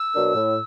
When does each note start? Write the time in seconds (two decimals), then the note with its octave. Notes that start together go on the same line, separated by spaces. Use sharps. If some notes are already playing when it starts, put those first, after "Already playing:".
Already playing: E6
0.14 B2 F#3 A#3 D4
0.34 A2